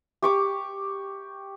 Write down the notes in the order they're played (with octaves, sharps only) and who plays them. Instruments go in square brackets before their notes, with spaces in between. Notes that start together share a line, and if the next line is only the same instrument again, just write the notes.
[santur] G4 C#6 D6